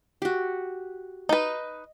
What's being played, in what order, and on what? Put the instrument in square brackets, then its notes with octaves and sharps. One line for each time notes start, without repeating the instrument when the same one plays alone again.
[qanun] F#4 G4
[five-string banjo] D#4 B4 [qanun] D#5